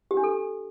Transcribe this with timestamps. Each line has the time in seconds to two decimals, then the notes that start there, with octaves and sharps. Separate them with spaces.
0.11 G4
0.17 D4
0.23 A4